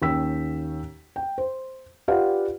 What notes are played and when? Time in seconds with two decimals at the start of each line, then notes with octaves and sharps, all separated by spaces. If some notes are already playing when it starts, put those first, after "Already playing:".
0.02 D#2 C#4 G5 E6 B6
1.16 G5
1.38 C5
2.08 F4 G4 B4 D5 F5 F#5